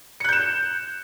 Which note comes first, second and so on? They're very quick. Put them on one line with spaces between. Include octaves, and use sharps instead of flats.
C#7 F#6 G6 E7